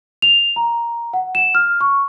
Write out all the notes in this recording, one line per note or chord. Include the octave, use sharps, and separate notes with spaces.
F7
A#5
F#5
E7
F6
C#6